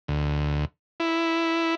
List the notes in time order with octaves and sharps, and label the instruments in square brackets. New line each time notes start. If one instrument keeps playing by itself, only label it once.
[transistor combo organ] D2
E4